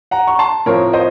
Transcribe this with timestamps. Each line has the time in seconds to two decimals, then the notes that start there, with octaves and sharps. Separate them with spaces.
0.11 F#5 A#5
0.27 C#6
0.39 A5 C6
0.66 A2 F3 C4 A#4 C#5
0.93 C5 D#5